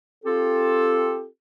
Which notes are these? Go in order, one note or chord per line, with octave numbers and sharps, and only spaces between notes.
C4 F4 G4 A4